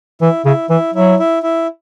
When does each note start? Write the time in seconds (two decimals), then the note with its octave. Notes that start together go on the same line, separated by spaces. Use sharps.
0.21 E3 E4
0.45 C#3 E4
0.70 E3 E4
0.94 F#3 E4
1.19 E4
1.43 E4